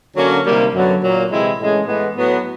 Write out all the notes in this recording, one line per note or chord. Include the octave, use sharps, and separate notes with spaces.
D3 F#3 A#3 C#4
C3 D#3 G3 A#3
F#2 D3 F#3 B3
A#2 F#3 A#3
C3 E3 G#3 C4 E4
A2 E3 G#3 C#4
A2 E3 G#3 B3
A2 F#3 B3